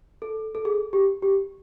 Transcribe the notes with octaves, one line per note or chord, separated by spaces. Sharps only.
A4
A4
G#4
G4
G4